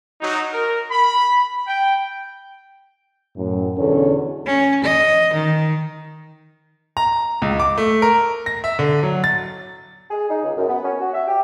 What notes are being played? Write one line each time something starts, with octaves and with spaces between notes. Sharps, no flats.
F#3 D#4
A#4
B5
G5
F#2 A2
E2 B2 D3 C#4 D4 A4
C#4
D#5
D#3
A#5
C#2
D6
A3
A#4
A#6
E5
D3
F#3
A6
G#4
D#4
C#2
F#2
B3
C#4
F#4
E5
G4